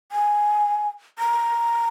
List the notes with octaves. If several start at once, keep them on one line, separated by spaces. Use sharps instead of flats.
G#5
A#5